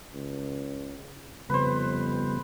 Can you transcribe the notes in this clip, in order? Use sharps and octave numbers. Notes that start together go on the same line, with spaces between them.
C#2
F2 C#3 G3 B3 B4 C5